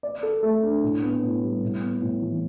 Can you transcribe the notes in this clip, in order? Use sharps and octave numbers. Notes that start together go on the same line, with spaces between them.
D5
A4
A3
D4
A2
B3
A2
G3
A2
B3
A2
E3